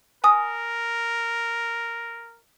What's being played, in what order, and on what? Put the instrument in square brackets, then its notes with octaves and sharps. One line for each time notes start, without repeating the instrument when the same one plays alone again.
[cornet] A#4 [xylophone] G#5 D#6